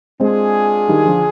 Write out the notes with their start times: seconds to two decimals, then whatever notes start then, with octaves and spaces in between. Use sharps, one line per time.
0.20 G#3 C4 D4 F4 G#4
0.88 D#3 G3
1.06 D3 F3